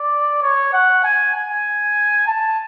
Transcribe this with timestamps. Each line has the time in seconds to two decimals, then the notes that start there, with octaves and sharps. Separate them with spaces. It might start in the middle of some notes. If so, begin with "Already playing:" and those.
Already playing: D5
0.42 C#5
0.73 F#5
1.04 G#5
1.35 G#5
2.27 A5